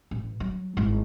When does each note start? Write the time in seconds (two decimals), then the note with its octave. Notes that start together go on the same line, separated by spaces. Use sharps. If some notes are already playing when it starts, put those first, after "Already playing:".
0.11 A1
0.40 F#3
0.77 G#1 E4